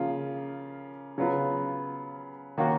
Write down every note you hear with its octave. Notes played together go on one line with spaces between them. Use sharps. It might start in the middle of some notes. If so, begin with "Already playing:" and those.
Already playing: C#3 F3 A#3 F4
C#3 F#3 B3 F4
D#3 A#3 C#4 F#4